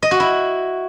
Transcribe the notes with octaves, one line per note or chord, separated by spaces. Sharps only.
D#5
F#4
E4